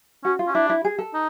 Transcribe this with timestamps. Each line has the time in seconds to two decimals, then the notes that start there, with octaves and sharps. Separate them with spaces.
0.24 C#4 F#4
0.39 F4
0.47 C#4
0.55 D4 E4
0.70 E4
0.85 G#4
0.98 A4
1.14 D#4